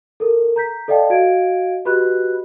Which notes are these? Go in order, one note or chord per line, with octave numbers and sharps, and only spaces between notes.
A4 A#4
A#5 G6 B6
A4 D5 D#5 F5 G5 A5
F#4 D#5 F5 G#6 D7
F#4 G4 B4 D#5 B5 F#6